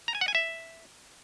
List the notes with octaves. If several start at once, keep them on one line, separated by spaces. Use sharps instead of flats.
A#5
G#5
F#5
G#5
E5